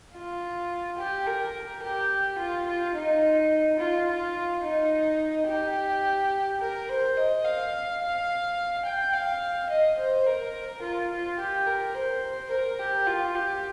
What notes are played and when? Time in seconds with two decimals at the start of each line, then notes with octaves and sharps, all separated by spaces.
0.14 F4
0.98 G4
1.26 A#4
1.83 G4
2.38 F4
2.67 F4
2.95 D#4
3.79 F4
4.07 F4
4.64 D#4
5.48 G4
6.60 A#4
6.89 C5
7.17 D#5
7.44 F5
8.01 F5
8.85 G5
9.13 F5
9.70 D#5
9.98 C5
10.26 A#4
10.82 F4
11.10 F4
11.39 G4
11.67 A#4
11.95 C5
12.51 A#4
12.79 G4
13.07 F4
13.35 G4